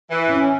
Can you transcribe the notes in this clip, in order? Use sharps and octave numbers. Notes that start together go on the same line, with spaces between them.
E3
C#4